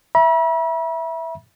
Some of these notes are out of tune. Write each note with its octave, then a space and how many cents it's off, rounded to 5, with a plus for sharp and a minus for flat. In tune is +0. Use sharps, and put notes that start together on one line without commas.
E5 +0 B5 -40